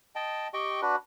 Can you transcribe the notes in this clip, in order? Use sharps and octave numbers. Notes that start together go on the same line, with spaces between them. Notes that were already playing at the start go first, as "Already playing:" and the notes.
D#5 G5 A5
G4 D#5 G5 C#6
D4 F#4 B4